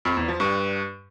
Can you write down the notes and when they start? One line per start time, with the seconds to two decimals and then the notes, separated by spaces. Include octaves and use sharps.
0.05 F2
0.17 E2
0.28 F3
0.40 G2